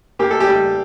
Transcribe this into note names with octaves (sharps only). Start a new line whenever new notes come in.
A#3 G4
A4
G4
G3